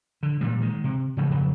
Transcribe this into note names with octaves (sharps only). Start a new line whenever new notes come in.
D3
A#2 E3 G3
D#3 G#3
C3
G#2 C#3 E3 F#3
F2 C#3 F#3